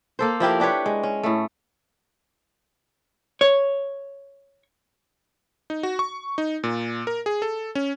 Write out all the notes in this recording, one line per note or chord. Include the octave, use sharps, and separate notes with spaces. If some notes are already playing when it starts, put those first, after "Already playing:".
A#3 A4 C5
F3 E4 G4 A#4
D4 G4 B4 C#5
G#3
C#4
A2 A3
C#5
D#4
F#4
C#6
D#4
A#2
A#4
G#4
A4
C#4